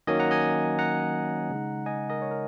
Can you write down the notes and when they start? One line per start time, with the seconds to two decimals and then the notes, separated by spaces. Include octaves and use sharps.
0.07 D#3 F#3 A#3 C#4 D#5 G#5
0.20 F#5 A#5
0.31 D#5 G#5
0.79 F#5 A#5
1.50 C#3 G#3 D#4
1.86 D#5 G#5
2.10 A#4 D#5
2.22 C#5
2.31 A#4